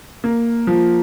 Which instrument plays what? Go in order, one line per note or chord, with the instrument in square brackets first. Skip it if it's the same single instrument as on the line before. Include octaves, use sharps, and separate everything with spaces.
[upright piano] A#3
F3